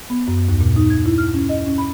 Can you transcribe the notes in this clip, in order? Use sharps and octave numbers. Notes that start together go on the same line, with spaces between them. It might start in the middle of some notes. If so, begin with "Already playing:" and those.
B3
F#2
D#2
A#2
D#4
G#6
E4
F6
C#4
D#5
C#4
B5